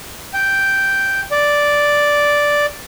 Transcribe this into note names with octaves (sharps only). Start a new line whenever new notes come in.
G5
D5